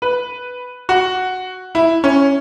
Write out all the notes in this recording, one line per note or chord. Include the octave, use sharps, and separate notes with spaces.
B4
F#4
E4
C#4